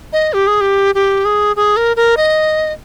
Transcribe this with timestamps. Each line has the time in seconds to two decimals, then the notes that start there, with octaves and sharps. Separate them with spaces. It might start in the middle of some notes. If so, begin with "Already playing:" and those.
0.13 D#5
0.33 G4
0.47 G#4
0.61 G4
0.95 G4
1.25 G#4
1.56 G#4
1.77 A#4
1.96 A#4
2.17 D#5